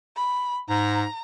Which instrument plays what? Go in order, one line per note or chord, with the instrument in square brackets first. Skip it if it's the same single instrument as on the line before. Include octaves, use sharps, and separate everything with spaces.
[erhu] B5
[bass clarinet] G#2 [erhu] A#5